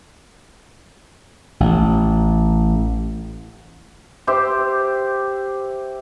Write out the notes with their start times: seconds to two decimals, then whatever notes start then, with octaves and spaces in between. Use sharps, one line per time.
1.60 A1
4.27 G4 C5 E5